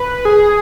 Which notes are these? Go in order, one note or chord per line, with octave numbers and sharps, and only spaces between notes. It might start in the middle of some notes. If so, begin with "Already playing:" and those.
Already playing: B4
G#4